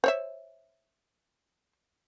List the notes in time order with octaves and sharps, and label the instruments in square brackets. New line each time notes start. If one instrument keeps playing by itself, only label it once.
[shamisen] C5 C#5 E5